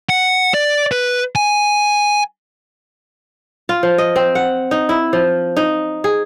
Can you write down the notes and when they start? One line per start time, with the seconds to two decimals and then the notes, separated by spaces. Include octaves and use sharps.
0.10 F#5
0.54 D5
0.92 B4
1.35 G#5
3.69 F4
3.83 F3
3.98 D#5
4.16 C4
4.35 F#5
4.71 D#4
4.89 E4
5.13 F3
5.57 D#4
6.04 G#4